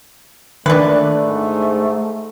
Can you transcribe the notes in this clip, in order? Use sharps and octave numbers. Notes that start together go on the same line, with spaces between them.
A#2 D#3 A3 D4 B4 D5
G#2